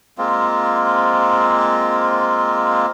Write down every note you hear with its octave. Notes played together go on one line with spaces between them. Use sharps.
G#3 A#3 C4 F4